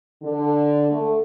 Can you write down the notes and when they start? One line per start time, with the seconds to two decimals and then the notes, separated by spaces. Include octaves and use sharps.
0.22 D3
0.90 A3